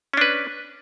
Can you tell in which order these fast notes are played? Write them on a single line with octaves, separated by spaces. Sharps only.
C#4 D4 B4